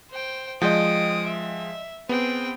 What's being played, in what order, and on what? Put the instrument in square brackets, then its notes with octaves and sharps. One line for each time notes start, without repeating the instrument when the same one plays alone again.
[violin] C5 G5
[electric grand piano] F3 G#3 [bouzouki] D#5 G5 [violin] D#6 D7
[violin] E5
[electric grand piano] B3 [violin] C4 G5 [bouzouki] G#4